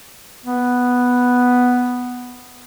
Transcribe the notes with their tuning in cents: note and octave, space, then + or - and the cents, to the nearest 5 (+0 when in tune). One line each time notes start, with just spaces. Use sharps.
B3 +0